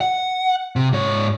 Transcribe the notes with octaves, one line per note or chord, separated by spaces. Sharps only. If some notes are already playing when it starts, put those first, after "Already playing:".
F#5
C3
G#2 C#5